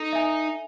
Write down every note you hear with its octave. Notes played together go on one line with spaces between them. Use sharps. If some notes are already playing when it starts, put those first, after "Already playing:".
Already playing: D#4 A4
E5 G#5